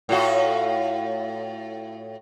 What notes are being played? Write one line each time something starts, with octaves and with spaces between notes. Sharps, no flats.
A2 F4 F#4